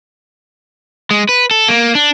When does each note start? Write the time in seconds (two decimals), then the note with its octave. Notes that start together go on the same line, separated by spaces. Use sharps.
1.11 G#3
1.29 B4
1.51 A4
1.68 A#3
1.95 D4